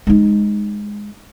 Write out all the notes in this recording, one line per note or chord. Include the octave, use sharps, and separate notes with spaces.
G#3 D#4